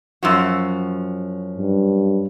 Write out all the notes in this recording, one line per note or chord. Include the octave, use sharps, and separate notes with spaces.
F#2 F3 F#4
G2